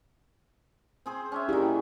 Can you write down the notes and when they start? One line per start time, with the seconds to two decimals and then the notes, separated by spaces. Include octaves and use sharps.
1.06 C4 G#4 C5
1.32 C#4 G#4 E5
1.49 A#2 D#3 E4 G4 G#4